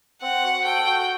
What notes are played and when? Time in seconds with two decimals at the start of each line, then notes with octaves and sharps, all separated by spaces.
0.22 C4 F#5
0.43 F#4
0.65 A4 G5
0.87 F#4